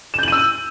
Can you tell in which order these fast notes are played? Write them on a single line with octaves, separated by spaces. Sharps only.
E7 G6 F#7 D#7 E6